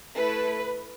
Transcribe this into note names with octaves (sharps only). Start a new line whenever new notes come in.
A3 E4 A4 B4